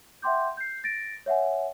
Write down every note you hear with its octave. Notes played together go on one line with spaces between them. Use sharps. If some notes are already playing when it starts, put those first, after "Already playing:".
E5 F#5 G5 C6 D6 G6
G6 C7
A6 A#6 D7
C#5 E5 F#5 G#5